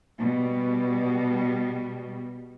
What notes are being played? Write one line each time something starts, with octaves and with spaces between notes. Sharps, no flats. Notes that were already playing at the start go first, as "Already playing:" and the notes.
B2 G3